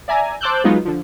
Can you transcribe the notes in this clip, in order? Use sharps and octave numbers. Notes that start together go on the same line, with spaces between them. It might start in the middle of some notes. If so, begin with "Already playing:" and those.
D5 E5 G#5 A#5
C5 A5 D6 E6 F#6 G6
F#3 G#3 B3 D#4 F4 G#4
D3 F3